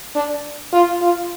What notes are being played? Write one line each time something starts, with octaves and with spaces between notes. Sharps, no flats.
D4
F4
F4